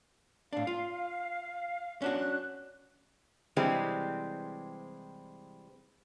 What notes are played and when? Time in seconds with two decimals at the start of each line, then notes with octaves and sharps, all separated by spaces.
0.53 A2 D4 F5
0.67 F4
2.02 C#4 D4 F#4 F#6
3.56 C3 E3 G3 G#3 C4